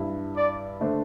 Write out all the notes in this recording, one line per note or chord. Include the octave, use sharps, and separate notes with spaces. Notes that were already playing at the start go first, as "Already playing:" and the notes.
Already playing: G2 G3 E4
D5
D3 A3 D4 C5